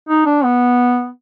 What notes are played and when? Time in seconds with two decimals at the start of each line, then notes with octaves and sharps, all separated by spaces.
0.09 D#4
0.26 D4
0.44 B3